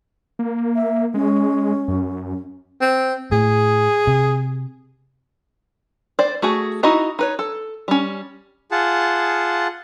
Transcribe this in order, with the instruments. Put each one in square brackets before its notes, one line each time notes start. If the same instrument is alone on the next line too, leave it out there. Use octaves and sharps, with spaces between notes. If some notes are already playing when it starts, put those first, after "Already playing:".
[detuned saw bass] A#3
[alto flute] E5
[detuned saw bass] G#3 [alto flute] C#4
[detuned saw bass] F#2
[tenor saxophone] C4
[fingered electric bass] A2 [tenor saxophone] G#4
[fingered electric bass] C3
[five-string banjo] C5 D5
A3 F#4 G#4
D#4 E4 F#4 D#5 A#5
D#4 B4 C#5
A4
G3 C#4
[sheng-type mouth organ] F4 G#4 F#5 A5